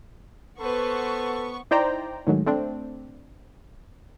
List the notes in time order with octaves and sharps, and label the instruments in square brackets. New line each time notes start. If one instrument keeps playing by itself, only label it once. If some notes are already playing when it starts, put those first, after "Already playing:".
[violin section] B3 C#6 [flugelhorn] A4 [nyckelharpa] B4 C5
[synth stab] D#4 E4 C5 D5 G5 A#5
A2 D#3 F#3 G#3
A3 C4 D4